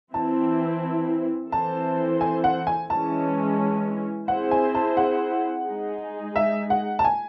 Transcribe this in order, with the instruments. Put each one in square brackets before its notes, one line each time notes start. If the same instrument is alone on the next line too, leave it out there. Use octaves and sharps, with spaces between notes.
[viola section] E3 C4 E4 [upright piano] A5
[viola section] E3 C4 E4 A4 C5 [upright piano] A5
[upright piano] G#5
F#5
G#5
[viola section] E3 G#3 C#4 [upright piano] A5
[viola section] C4 E4 G#4 C5 [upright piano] F#5
[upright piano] G#5
A5
F#5
[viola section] G#3 D#4 G#4
[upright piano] E5
F#5
A5
G#5